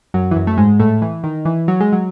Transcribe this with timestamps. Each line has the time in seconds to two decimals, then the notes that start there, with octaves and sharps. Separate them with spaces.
0.14 F#2 F#3
0.31 E3
0.36 F#2 F#3
0.47 A3
0.57 G#2 G#3
0.79 A2 A3
1.02 E3
1.24 D#3
1.45 E3
1.68 F#3
1.80 G#3
1.92 F#3